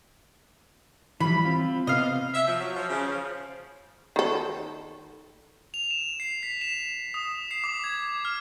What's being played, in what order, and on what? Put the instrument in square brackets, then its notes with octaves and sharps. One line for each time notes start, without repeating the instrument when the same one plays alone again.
[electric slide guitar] E3 F3 G3 [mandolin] B5
[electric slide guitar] C4 F4
[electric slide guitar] C3 B3 [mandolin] D#5 F5
[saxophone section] E5
F3
F#3
F3
C#3
F3
[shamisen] D#3 A4
[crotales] F7
E7
C7
B6
E7
D#6
C7
D6
G#6
F6